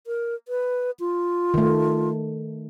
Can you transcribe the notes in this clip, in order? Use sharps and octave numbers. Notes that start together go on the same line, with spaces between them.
A#4
B4
F4
D#3 A3